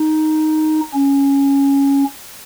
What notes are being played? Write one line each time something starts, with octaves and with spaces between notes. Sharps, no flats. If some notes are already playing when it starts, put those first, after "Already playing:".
Already playing: D#4
C#4